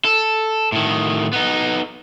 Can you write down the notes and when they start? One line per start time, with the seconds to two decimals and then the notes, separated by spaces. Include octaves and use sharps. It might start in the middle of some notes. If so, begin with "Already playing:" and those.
0.05 A4
0.72 A2 D#3
1.33 B3 D#4